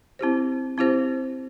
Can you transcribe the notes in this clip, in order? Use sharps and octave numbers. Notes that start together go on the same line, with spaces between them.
C4 E4 G4 C5
C4 E4 G4 C5